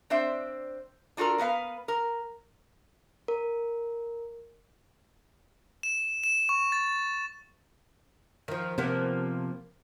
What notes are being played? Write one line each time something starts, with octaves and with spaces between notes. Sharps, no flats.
C4 D4 C5 E5
D4 F4 F#4 A4 A#4
A#3 B3 B4 F5
A#4
A#4
E7
E7
C#6
A6
D#3 F3
C3 F3 A#3 B3